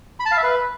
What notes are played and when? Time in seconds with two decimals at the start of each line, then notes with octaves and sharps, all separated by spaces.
0.20 B5
0.26 A5
0.31 F5
0.37 E5
0.43 B4